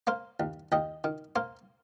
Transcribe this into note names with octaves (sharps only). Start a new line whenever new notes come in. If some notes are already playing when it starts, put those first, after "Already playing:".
A#3 C5 F5
D#2
D#2 D#5 G5
D#3
A#3 C5 F5